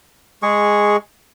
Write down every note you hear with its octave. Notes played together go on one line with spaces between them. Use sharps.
G#3 G#4 C#6